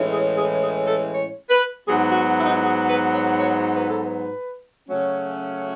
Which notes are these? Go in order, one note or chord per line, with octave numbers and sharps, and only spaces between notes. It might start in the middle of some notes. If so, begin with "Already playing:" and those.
Already playing: A2 E3 G#3 C#4
G#4
G#4
G#4
A4
C#5
B4
G#2 F#3 B3 G#4
F#4
E4
D#4
E4
G#4
B4
C#5
C#5
B4
A4
B4
C#3 F#3 A3 C#4